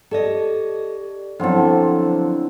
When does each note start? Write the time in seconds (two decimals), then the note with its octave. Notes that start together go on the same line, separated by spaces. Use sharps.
0.11 G4 A4 D5 D#5
1.40 D3 F3 F#3 B3 C4 E4